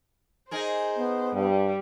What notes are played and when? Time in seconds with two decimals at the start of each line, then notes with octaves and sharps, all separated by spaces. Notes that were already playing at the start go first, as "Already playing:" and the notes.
0.51 D#4 G#4 A#4 C5
0.96 B3
1.34 G2 G3